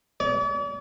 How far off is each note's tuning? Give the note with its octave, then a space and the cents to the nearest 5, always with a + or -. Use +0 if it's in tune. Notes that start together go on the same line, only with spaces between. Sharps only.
D5 -45